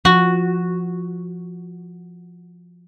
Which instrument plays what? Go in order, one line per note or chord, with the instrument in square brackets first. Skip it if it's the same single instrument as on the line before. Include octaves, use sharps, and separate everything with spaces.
[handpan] F3 [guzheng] F#4